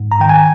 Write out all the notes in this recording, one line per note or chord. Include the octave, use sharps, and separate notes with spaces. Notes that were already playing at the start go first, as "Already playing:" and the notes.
Already playing: G#2
A#5
D#3 G5
G#5